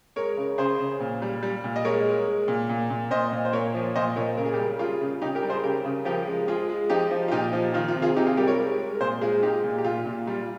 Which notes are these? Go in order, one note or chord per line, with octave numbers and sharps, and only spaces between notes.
G#3 A#4 C#5
C#3
C#3 G#4 C5
C#3
A#2
G3
G3
A#2
D#5
G#3 A#4 C#5
G#3
G#3
A#2
A#2
A#2
A#2 C5 D#5
A#2
C5
A#2 A#4 C#5
F3
A#2 C5 D#5
A#2 A#4 C#5
C#3 A#4
G#4
G4 A#4
G3
G3 F4 G#4
C#3
C#3 D#4 G4
G4 A#4
G3
G#4 C5
C#3 G4 A#4
C#3
F3 G4 A#4
G#3
G#3 F4 G#4
G#3
F3 D#4 G4
F3
F4
A#2 D#4 G4
F3
D#3 F4
F4
C3
F4 G#4
C3 D#4 G4
F4 G#4
G3 G4 A#4
A#4 C#5
G#3
G#3
A#4
A#2 G#4 C5
G#3 F4 G#4
G#3 D#4 G4
A#2
G4
A#2 F4
A#2
G3 F4